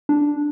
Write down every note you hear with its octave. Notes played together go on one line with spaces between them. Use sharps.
D4